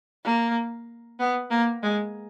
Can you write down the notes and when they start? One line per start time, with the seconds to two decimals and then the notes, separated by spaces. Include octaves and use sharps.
0.24 A#3
1.20 B3
1.51 A#3
1.83 G#3